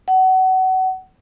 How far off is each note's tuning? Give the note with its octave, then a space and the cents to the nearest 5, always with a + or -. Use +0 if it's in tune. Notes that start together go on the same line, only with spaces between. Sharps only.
F#5 +25